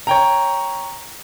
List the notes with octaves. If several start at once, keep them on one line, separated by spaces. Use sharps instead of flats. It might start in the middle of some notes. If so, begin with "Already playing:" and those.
C#5 G5 A#5